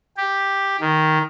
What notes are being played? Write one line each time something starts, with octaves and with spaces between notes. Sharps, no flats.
G4
D#3